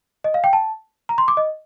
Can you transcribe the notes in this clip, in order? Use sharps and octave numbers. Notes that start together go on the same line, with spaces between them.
D#5
F5
G5
A5
A#5
C6
D6
D#5